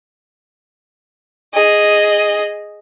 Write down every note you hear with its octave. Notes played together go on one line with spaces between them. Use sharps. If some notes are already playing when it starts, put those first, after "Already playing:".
G#4 D#5